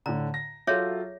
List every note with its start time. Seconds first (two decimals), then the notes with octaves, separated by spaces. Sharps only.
0.06 A2 D3 A#5
0.34 A#6
0.67 F#3 F4 G#4 A4 C#5 E5